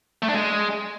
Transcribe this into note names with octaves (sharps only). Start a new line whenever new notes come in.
A3
D4
G#3